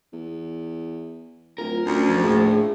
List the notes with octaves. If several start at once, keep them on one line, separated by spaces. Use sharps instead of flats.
E2
D1 F4 A#4
D2 C#4
F2
A#1 A2 G#4